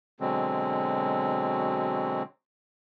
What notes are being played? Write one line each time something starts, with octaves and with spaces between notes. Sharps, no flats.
B2 D3 F#3 G#3 C4